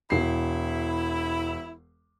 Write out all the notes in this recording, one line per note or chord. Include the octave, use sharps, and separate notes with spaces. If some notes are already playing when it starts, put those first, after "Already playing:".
E1 E4 C7